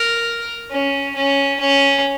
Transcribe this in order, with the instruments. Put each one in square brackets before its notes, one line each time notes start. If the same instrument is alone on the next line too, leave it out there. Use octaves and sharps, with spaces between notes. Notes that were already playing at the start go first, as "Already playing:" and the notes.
Already playing: [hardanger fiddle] A#4
C#4
C#4
C#4